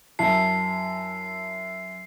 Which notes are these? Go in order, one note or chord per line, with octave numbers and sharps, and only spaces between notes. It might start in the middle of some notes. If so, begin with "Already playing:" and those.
F#2 E4 A5 C7